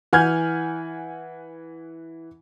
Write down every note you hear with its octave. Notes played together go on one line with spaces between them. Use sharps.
E3 F#5 G#5 F6 G6 G#6